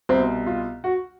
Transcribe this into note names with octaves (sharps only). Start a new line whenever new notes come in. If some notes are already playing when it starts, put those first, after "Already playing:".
C2 B2 C4
F4
F#4